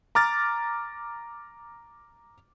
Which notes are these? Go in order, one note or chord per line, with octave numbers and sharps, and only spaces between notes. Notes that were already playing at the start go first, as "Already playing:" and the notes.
A#5 D6 F6 A6